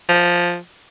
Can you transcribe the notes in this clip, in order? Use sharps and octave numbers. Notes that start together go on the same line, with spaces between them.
F3